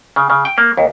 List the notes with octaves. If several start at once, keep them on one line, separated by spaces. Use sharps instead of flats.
C#3
C#3
G5
A#3
D#2